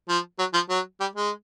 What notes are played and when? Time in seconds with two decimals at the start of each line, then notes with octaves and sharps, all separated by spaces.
0.09 F3
0.39 F#3
0.54 F3
0.70 F#3
1.00 G3
1.16 G#3